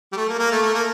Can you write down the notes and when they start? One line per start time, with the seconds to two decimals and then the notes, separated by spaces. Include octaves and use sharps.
0.12 G3
0.17 A3
0.29 A#3
0.39 A#3
0.51 A3
0.62 A3
0.74 A#3